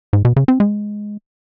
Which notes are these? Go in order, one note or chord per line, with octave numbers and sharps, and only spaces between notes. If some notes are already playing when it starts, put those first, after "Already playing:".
G#2
B2
C#3
C4
G#3